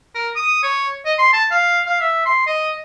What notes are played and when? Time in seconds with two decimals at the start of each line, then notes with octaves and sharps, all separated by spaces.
0.15 A#4
0.36 D#6
0.63 C#5
1.05 D#5
1.19 C6
1.33 A5
1.51 F5
1.86 F5
2.00 E5
2.26 C6
2.47 D#5